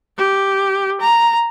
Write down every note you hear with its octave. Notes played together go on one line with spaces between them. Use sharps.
G4
A#5